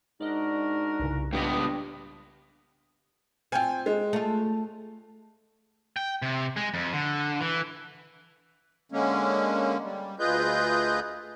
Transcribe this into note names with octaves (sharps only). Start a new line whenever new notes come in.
G#2 D4 F#4 A#4 D5 D#5
C2 G2 C#3
C#2 G2 B3 G5 D6 A#6
C4 F4 G5 G#5
G#3
A3 F4
G5
C3
G#3
F2
D3
E3
D3 G#3 A#3 C#4
G3
D2 F4 G#4 B4 D#5 G6